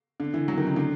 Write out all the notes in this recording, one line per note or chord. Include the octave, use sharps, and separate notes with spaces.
D3
E3
F#3
D#3
C#3
D3